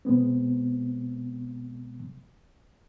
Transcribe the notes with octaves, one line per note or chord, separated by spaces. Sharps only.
B2 G#3 B3 C4